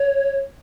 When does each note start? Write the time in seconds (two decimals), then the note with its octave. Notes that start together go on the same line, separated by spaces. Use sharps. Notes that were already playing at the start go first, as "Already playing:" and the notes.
Already playing: C#5